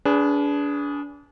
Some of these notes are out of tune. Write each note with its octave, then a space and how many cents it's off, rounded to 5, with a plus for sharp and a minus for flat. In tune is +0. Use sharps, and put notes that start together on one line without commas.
D4 -30 G#4 +0 B4 +0